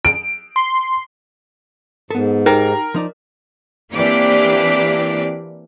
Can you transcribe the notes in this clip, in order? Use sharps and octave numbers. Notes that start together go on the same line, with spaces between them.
D7
C6
G#2 B3 A4 A#4
D#4 G4 A#4 G5 A#6
F3 D#4 A#4 D5
E3 A#3 C4 D4 G4 D5